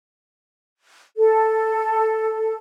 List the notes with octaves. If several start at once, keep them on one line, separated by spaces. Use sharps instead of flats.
A4